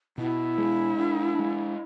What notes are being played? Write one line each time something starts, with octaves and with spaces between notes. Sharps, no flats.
B2 E4
G#3
D4
G#3